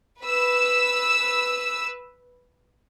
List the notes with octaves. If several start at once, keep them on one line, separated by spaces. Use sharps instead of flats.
B4 E6